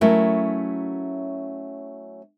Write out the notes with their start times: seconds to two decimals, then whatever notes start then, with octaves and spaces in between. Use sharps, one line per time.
0.01 F#3 A3 C#4 E4 F#4 A#4